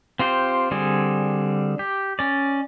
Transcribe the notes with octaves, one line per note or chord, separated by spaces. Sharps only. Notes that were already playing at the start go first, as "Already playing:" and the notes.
C4 F4 G4 C5
D3 G3 C4 G#4
G4
C#4 D5